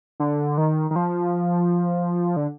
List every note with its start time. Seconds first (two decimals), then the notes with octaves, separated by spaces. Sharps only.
0.20 D3
0.58 D#3
0.91 D#3
0.96 F3
2.36 D3